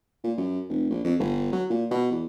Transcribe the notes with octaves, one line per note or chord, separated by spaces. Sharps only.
A#2
F#2
F1
A#1
F2
G1
F#3
A#2
B2
E2